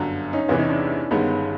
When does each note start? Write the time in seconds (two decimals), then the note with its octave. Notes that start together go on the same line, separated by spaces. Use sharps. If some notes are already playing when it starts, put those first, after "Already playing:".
Already playing: G1 F#2 D3 F#3
0.33 C#4 D#4
0.48 E2 C3 E3 B3 C#4
0.59 C#4 D#4
0.69 D4 E4
1.10 G1 G2 D#3 G#3 B3 C#4 D#4